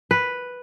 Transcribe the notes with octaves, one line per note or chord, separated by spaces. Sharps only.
B4